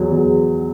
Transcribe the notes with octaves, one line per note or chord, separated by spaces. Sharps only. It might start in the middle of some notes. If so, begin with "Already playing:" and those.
Already playing: E2 F#3
E2